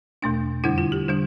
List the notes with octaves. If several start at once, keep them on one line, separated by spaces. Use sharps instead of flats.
E2 B2 A3 D4
F2 D3 G3 D4 E4
F4
G4
D3 G3 D4